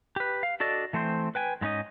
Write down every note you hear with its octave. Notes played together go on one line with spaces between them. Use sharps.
G4 B4
F5
D4 F#4 A4 D5 D#5
E3 A3 C4 C5
B4 G5 G#5
G#2 G#3 C#4 D#4 D#5